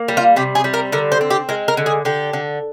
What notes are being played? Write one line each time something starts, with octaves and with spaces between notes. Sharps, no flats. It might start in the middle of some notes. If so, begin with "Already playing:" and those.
Already playing: A#3
G3
F4
C3 G4
G#4
G3
A#4
D3 A#4
C5
C4
G4
G#3 A#4
A#4
D3
G#4
D3 G4
D3